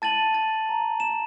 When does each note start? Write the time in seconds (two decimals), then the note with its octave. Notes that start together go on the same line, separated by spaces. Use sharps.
0.02 A5 A6 D#7 F#7
0.34 A6
0.69 A#5
1.00 E7